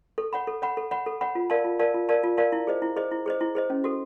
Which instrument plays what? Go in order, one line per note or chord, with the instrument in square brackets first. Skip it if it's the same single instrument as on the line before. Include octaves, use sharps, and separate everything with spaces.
[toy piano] A4
C#5 F#5 B5
A4
C#5 F#5 B5
A4
C#5 F#5 B5
A4
C#5 F#5 B5
F4
A#4 D5 F5 A5
F4
A#4 D5 F5 A5
F4
A#4 D5 F5 A5
F4
A#4 D5 F5 A5
E4
G#4 C5 D#5
E4
G#4 C5 D#5
E4
G#4 C5 D#5
E4
G#4 C5 D#5
C#4
F#4 A4